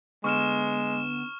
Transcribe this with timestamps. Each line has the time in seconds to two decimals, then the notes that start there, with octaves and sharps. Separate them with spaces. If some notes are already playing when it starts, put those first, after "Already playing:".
0.24 D3 G#3 B3 C#6 F6 E7